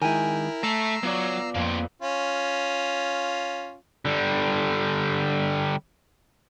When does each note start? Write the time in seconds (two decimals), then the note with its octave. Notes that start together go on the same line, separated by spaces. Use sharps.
0.02 D#3 G#3 E4 A#4 G5 G#5
0.63 A3 E5 A5 A#5 E6 C7
1.03 F#3 B3 F4 D5
1.55 F2 A#3 C4
2.02 C#4 F4
4.05 D3 G3